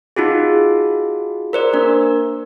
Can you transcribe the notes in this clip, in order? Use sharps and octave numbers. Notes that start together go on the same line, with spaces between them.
D#4 F4 F#4 G#4
A#4 C5 D5
A#3 D4 A#4